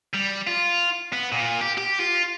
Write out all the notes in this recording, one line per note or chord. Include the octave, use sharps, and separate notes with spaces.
G3
F4
B3
A#2
G4
G4
F4